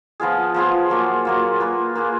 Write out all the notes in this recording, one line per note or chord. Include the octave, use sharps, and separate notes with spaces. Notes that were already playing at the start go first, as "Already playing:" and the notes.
F3 B3 F4 G#4
F3 B3 F4 G#4
F#3 A#3 F4
F#3 A#3 F4
A#3 F4 G#4 B4
A#3 F4 G#4 B4